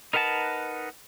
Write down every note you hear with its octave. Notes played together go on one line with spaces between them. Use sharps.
D#4 A#4 B4 F#5 A5